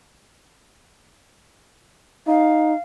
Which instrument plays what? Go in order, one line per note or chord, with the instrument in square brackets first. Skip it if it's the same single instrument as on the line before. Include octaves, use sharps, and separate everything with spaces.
[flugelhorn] D#4 [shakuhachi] F5